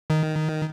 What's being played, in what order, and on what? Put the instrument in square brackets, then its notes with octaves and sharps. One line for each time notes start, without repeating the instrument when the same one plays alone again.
[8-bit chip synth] D#3